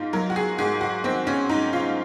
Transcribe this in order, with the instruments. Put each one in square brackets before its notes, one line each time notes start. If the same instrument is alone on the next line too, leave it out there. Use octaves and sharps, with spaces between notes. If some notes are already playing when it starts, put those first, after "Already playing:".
Already playing: [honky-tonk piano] G#2 D#4 F4
F#3 A#4
F#4
G#4
G#2 G#4
F#4
D#3 C4
C#4
G#2 D#4
F4